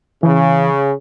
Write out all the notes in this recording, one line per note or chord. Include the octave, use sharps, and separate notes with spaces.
C#3 E3